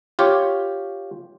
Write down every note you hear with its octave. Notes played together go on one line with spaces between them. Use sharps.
F4 G4 C#5